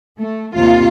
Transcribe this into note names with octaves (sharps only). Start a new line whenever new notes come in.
A3
D#2 C3 F4